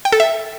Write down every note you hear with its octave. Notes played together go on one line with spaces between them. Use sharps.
G5
A4
E5